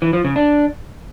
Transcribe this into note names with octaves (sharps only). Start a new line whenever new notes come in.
E3
F3
C#3
D4